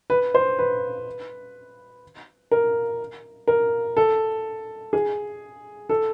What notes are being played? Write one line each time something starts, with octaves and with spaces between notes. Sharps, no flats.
B4
C5
B4
A#4
A#4
A4
G#4
A4